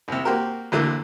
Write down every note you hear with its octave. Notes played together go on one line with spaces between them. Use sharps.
C2 C3
A#3 C4 F#4 G4 A#4
A1 D2 D3 A3 A#3 E4